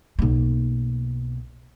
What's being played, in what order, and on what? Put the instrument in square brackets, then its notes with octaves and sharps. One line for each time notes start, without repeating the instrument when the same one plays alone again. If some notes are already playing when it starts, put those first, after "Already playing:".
[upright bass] B1 A#3